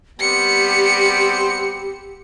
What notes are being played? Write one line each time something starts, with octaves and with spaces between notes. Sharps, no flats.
G3 B3 C4 G4 C#7